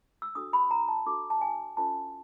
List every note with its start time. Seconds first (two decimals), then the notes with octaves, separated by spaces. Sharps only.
0.22 E6
0.35 D4 F#4 A4 D#6
0.53 B5
0.71 A#5
0.88 A5
1.06 D4 F#4 A4 D6
1.30 A5
1.41 G#5
1.77 C#4 F4 A4 C5 A5